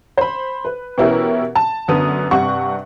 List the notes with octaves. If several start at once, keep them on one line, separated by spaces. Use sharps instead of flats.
C5 B5
B4
B2 E3 C#4 E4 G4 A#4
A5
F#2 D3 B3 D#6
G2 C3 F#5 C#6